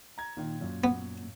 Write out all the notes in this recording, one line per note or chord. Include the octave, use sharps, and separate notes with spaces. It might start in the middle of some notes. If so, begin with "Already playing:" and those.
A#5 G#6
A#2 D#3
F#2 A#2
B3